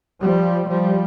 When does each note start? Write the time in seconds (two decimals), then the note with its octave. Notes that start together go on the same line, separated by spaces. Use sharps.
0.22 F3 G3
0.69 F3 G3